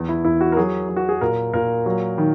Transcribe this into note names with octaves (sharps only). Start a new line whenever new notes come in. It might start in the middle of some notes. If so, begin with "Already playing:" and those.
Already playing: E2
E4
E2 E4
F#4
A#4
F#3 G#4
F#3
F#4
G#4
A#2 A#4
A#2 A#4
F#3
D#3